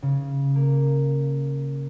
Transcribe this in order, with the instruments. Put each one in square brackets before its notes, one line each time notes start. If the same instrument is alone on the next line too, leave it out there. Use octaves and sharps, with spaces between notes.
[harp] C#3
A#3